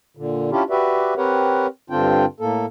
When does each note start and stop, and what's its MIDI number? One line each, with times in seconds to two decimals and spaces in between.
0.17 0.50 46
0.17 0.50 50
0.51 0.63 61
0.51 0.63 62
0.51 0.63 64
0.51 0.63 65
0.51 0.63 67
0.70 1.14 66
0.70 1.14 67
0.70 1.14 71
0.70 1.14 74
0.70 1.14 76
1.17 1.67 60
1.17 1.67 67
1.17 1.67 70
1.17 1.67 71
1.17 1.67 73
1.17 1.67 78
1.90 2.25 43
1.90 2.25 50
1.90 2.25 60
1.90 2.25 62
1.90 2.25 65
1.90 2.25 79
2.40 2.66 45
2.40 2.66 58
2.40 2.66 69